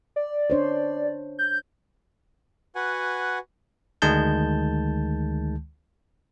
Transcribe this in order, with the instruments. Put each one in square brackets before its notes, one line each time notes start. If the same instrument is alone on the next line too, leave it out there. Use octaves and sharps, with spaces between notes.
[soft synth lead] D5
[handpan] D4 C5 C#5
[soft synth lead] G6
[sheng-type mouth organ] F#4 B4 F#5 G#5
[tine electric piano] D2 D#3 G#3 A5 G6